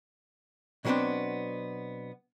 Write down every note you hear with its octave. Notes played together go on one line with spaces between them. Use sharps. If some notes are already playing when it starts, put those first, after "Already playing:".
B2 F#3 G#3 B3 C4 D4